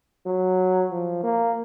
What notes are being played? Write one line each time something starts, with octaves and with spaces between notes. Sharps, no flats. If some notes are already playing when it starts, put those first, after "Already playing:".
F#3
F3
A#3